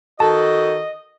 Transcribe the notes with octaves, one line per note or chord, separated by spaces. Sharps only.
D#3 F#4 A4 D#5 A5